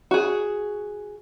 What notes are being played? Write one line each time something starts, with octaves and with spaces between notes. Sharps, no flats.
F#4 G#4